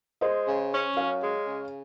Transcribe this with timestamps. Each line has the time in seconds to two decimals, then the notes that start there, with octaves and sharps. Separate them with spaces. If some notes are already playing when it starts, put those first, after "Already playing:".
0.21 G#3 C5 D#5
0.47 C#3
0.72 C#4
0.96 F#2 C#5 F5
1.21 G#3
1.47 C#3